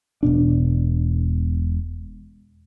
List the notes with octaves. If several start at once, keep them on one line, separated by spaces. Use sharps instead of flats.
E1 B2 D4